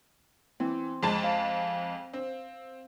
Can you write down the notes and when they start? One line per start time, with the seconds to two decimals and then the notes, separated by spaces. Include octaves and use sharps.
0.60 E3 C4
1.03 F2 G#3 A5
1.24 F5
2.13 C4